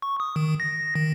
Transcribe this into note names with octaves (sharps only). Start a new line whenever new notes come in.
C#6
D#6
D#3
A#6
D#3